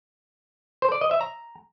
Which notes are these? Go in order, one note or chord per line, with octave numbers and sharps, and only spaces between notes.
C5
D5
D#5
E5
A#5